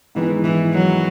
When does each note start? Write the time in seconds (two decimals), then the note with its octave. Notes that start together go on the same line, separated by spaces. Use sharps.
0.15 G#2 D#3 E3 G#3 B3 E4
0.44 E3
0.73 F#3